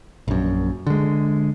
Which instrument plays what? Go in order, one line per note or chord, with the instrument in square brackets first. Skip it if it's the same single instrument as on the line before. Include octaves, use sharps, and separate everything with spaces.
[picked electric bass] A#1 F#2
D3 G#3